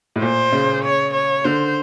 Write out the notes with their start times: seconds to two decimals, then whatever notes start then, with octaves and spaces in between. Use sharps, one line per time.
0.16 A2
0.22 A#2 C5
0.52 C#3
0.84 C#5
1.14 C#5
1.44 D3 C5